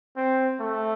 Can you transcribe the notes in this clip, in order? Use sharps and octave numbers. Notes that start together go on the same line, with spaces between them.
C4
A3